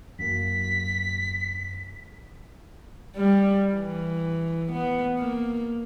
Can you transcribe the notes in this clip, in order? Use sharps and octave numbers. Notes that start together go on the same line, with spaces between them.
F#2 F#3 A#3 B6
G3
E3
B3
A#3